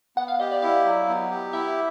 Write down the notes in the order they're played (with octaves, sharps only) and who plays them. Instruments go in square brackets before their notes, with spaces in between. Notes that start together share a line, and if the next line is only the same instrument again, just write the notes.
[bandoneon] B3 [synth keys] F#5
[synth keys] F5
[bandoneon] G4 [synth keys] D#5
[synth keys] D5
[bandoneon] E4 [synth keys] F5
[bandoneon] F#3
B3
G4
[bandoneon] E4 [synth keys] E5